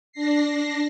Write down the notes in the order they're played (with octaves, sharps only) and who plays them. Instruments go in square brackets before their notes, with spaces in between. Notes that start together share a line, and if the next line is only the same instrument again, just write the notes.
[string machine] D4 A#6 C7